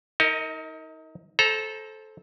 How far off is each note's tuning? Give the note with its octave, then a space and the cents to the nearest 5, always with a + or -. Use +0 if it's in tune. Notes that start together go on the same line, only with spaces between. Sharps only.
D#4 +35 A#4 -20 D#5 +0
A4 -15 C5 +10 A#5 +10